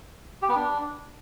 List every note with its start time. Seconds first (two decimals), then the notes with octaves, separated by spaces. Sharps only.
0.42 G4
0.49 B3
0.56 D4